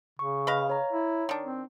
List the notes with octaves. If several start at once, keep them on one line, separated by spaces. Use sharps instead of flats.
C#3 C#6
B4 D#5 F5
C#5 A#5
E4
D#3 D4
C4